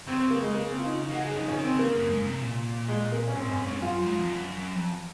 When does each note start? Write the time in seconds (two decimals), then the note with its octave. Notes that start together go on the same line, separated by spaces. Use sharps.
0.07 C#3 C4
0.19 C4
0.31 A#3
0.42 G#3
0.55 A#3
0.70 C4
0.79 F4
0.85 D#4
1.02 D#4
1.11 A#3 F#4
1.19 G#3
1.25 G#4
1.30 F#3
1.36 D#4
1.39 F3
1.48 D#3 C#4
1.64 C4
1.71 C#3
1.79 A#3
1.95 F#2
2.10 G#2
2.26 C3
2.42 A#2
2.88 G#3
3.12 A#3
3.28 C#4
3.35 G#2 C4
3.51 F#2 C#4
3.66 G#2 C#4
3.82 F#2 F4
4.02 F#2
4.06 G#2
4.19 F2
4.29 F#2
4.53 F#2
4.75 F2